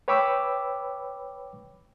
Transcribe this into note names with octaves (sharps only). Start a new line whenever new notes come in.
B4 C#5 G5 B5 D6 E6